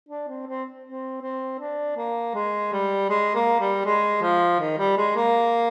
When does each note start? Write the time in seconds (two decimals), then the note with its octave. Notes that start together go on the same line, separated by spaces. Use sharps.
0.09 D4
0.28 C4
0.47 C4
0.84 C4
1.22 C4
1.60 D4
1.97 A#3
2.34 G#3
2.72 G3
3.10 G#3
3.35 A#3
3.60 G3
3.85 G#3
4.22 F3
4.60 D#3
4.78 G3
4.98 G#3
5.16 A#3